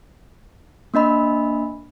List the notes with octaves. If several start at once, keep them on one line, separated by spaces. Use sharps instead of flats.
A#3 D4 D#5 B5